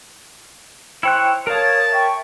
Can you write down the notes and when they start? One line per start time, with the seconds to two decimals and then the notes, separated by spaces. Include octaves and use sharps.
1.03 E4 C5 C#5 G5 F#6
1.47 A#4 C#5 F5 A5 D#6
1.92 E5 G5 C#6